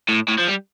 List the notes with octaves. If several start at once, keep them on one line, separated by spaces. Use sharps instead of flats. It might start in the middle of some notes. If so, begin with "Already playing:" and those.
A2
A2
F3
G3